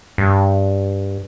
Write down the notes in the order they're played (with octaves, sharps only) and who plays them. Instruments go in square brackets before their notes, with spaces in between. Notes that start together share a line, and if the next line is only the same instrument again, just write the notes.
[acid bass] G2